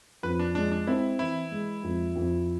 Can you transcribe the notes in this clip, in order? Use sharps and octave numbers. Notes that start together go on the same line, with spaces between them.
F2 B4
D4
G#3 D4
D4
C4 E4
E3 E4
G#3
F2
F2